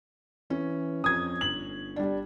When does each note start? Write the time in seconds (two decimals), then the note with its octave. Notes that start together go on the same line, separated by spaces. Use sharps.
0.50 E3 C#4
1.04 F2 D#6 G#6
1.41 G1 F#7
1.96 G3 D4